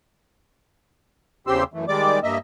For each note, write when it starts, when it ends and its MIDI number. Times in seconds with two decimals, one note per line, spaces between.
1.47 1.64 40
1.47 1.64 49
1.47 1.64 60
1.47 1.64 67
1.47 1.64 84
1.47 1.64 88
1.74 1.85 42
1.74 1.85 52
1.74 1.85 57
1.88 2.19 51
1.88 2.19 55
1.88 2.19 56
1.88 2.19 74
1.88 2.19 86
2.23 2.38 43
2.23 2.38 58
2.23 2.38 75
2.23 2.38 76